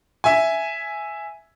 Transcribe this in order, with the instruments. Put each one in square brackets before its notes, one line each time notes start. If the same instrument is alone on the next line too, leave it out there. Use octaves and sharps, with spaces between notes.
[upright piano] E5 G#5